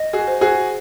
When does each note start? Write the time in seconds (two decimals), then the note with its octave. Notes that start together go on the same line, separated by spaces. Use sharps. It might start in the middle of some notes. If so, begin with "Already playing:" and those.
Already playing: D#5
0.13 F#4 G#4
0.28 C5
0.41 F#4 G#4